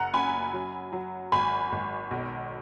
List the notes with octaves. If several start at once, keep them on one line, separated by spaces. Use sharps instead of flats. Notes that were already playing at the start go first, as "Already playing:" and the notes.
Already playing: F#1 F#5 A#5
F#2 G#5 B5
F#3
F#3
G#1 G#5 B5
G#1
B1